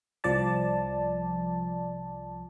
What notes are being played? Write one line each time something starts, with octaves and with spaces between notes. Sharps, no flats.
C2 F3 D5 A5